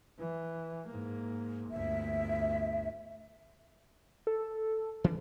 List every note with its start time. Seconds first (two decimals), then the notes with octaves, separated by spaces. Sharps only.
0.19 E3
0.87 G#2 A#3
1.70 G1 D2 E5
4.27 A4
5.04 E3 D4